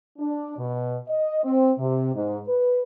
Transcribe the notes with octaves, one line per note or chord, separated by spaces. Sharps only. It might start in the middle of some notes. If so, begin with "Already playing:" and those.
D4
B2
D#5
C4
C3
G#2
B4